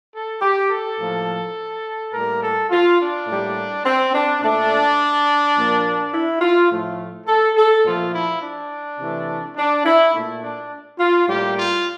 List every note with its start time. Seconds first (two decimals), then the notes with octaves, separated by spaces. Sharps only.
0.12 A4
0.41 G4
0.69 A4
0.98 A2 F3 A#3
2.13 A2 G3 A#3 A#4
2.41 A4
2.69 F4
2.99 D4
3.26 A2 G3 A#3
3.84 C4
4.12 D4
4.41 A#2 A3 D4
5.56 A#2 F3 A#3
6.12 E4
6.41 F4
6.70 A2 F3 A3
7.26 A4
7.55 A4
7.84 A#2 F3 A3 F4
8.13 E4
8.41 D4
8.99 C3 E3 A3
9.56 D4
9.84 E4
10.13 A#2 A3
10.41 D4
10.98 F4
11.27 A2 G3 A#3 G4
11.55 F4